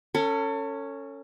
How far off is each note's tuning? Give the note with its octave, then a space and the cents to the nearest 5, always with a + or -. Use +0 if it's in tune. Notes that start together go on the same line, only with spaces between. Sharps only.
C#4 +0 A4 +35